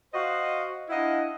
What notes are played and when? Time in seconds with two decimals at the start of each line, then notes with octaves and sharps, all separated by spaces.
0.14 F#4 C5 D#5 F5 F#5
0.89 D4 E4 D#5 F5 F#5